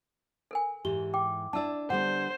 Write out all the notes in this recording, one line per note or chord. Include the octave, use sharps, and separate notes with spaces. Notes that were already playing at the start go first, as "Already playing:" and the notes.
A4 A#4 G#5
G#2 E3 G4 G7
G5 D6
D4 E4 D5 A5 E6
D3 G3 B3 C5 F#5